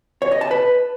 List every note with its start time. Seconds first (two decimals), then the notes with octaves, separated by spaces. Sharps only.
0.22 C#5
0.31 D#5
0.41 A5
0.51 B4